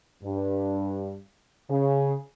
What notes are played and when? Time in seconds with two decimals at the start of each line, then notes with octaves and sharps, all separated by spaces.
0.24 G2
1.70 C#3